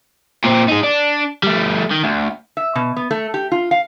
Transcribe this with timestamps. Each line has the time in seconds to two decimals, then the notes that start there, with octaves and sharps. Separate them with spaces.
0.45 A#2 C4
0.69 D#4 G#4
0.84 D4
1.43 G3 A3
1.91 D#3
2.04 D2
2.57 E5
2.75 B2
2.96 B3
3.11 A3
3.34 G4
3.52 F4
3.71 F5